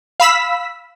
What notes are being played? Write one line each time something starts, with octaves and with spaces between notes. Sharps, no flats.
F5 B5 E6 B6